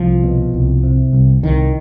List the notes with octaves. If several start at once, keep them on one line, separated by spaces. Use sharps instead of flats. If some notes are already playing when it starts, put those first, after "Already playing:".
Already playing: C2 F3
B2
C2
C3
C2
C2 D#3